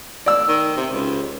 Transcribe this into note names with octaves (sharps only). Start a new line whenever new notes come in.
D5 E6
D#3
C3
C#2